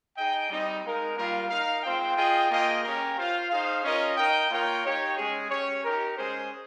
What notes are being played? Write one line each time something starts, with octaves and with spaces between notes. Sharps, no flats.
D#4 G#4 D#5 G5
G3 C4 D#4
G#3 D#4 A#4 F5
G3 A#3 F4 A#4 F5
D#4 A#4 F5
G#3 C4 F4 C5 G5
F4 G#4 D#5 G5
A#3 F4 G#4 D#5 G5
C#4 G4 A#4
F4 C5 F5
D#4 G#4 C5 F5
C#4 F4 A#4 D#5
D#4 A#4 D#5 G5
A#3 F4 A#4 C#5 G5
D#4 G4 C#5 G5
G#3 C#4 G#4
C#4 G4 C#5
D#4 G4 A#4
G#3 C#4 G#4 C5